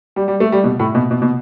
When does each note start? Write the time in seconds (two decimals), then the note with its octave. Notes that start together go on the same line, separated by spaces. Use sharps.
0.16 G3
0.28 G3
0.40 A3
0.52 G3
0.64 B2
0.80 A2
0.95 B2
1.11 B2
1.22 B2